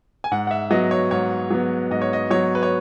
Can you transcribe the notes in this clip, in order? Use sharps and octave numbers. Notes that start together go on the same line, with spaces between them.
G#5
G#2 F#5
F#5
E5
F#3 B3 D#5
C#5
G#2 C#5
F#3 B3
G#2 D#5
C#5
D#5
F#3 B3 C#5
B4
C#5